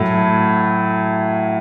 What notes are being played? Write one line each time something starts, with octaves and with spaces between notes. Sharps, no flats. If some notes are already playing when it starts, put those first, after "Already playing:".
Already playing: A2 F#3 A3